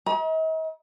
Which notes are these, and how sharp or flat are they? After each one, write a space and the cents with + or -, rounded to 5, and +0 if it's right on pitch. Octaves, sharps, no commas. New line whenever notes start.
D#5 +45 A#5 +40